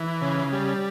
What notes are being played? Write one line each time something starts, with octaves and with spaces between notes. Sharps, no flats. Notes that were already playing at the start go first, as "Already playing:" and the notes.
Already playing: E3
C#3
G3